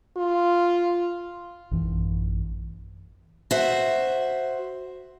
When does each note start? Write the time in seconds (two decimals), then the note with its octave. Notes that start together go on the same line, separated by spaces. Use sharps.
0.17 F4
1.71 A1 F#2 E3
3.51 F#4 C5 E5